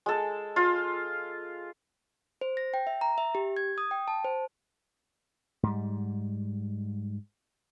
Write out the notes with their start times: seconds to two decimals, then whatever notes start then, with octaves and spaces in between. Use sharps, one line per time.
0.06 G#3 A4
0.56 F4
2.41 C5
2.57 A#6
2.74 G5
2.87 E5
3.01 A#5
3.18 E5
3.35 G4
3.57 G#6
3.78 D#6
3.91 G5
4.08 A5
4.25 C5
5.63 G#2 G3